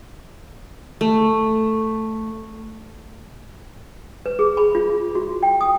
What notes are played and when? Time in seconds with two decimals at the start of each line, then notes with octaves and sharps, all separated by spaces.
1.01 A3
4.26 B4
4.39 G#4
4.57 B5
4.75 F4
5.15 F#4
5.43 G5
5.61 D#6